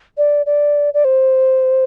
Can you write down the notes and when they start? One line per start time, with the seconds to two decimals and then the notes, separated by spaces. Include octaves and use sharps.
0.18 D5
0.46 D5
0.94 D5
1.05 C5